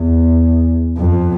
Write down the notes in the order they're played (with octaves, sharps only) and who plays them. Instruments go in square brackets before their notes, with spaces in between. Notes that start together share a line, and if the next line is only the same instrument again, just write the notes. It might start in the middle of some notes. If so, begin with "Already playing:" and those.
Already playing: [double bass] E2
F2